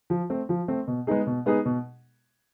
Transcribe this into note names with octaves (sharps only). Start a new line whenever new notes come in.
F3
A3 C4
F3
A3 C4
B2
G#3 B3 D#4 G#4
B2
G#3 B3 D#4 G#4
B2